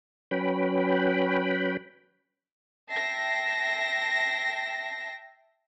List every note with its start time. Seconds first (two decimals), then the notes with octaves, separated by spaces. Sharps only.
0.31 F#3 C#4 B4 G5 B5
2.92 E5 G5 A5 A#6 C7